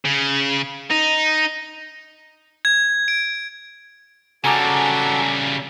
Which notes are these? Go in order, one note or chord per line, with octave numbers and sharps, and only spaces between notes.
C#3
D#4
G#6
D7
C#3 G3 F#4 A4 G#5 A#5 D6 E6